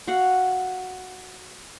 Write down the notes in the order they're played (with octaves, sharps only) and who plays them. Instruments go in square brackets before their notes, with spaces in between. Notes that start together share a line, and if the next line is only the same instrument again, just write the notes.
[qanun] F#4 F5 F#5